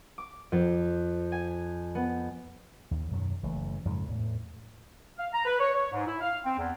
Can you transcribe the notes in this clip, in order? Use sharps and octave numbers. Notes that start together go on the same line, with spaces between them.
D6
F2
G#5
B3
D#2
F#2 B2 D#3 F#3
F#1 E3 A3
F2 G#2 C#3 F3
E2 A2
F5
A#5
B4
C#5
C#5
G#2
E4
F5
C4
E2